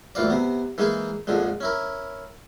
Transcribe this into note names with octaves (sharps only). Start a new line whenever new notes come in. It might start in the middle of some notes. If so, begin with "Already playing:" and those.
D2 A#2 E3 F4 D5
C3 B3
E3 G#3 A#3 D#4 G#4
A#1 F2 D3 G#3
C#4 E4 A#4